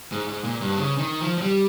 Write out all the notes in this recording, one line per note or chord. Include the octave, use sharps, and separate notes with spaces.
G#2
G#2
A#2
G2
C#3
D#3
F3
F3
G3